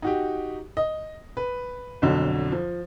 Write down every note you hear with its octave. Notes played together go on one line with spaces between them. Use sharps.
D#4 F#4 G4
D#5
B4
B1 F2 D3 F#3
F3